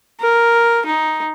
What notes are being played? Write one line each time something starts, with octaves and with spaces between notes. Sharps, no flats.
A#4
D#4